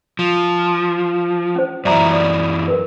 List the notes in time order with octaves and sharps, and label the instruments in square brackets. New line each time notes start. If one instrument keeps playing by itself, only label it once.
[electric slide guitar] F3
[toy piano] C#4 C5
[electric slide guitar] F#2 E3 [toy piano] D5 E5 A#5
[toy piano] D5
A#4 B4